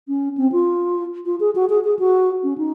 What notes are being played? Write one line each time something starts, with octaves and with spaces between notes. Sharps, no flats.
C#4
C4
F4
F4
G#4
F#4
G#4
G#4
F#4
C#4
D#4